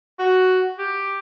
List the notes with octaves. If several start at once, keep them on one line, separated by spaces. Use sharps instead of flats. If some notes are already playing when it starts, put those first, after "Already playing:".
F#4
G4